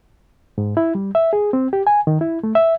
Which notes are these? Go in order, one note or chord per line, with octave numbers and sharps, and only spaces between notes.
G#2
E4
G3
E5
G#4
C4
G4
G#5
D#3
E4
A3
E5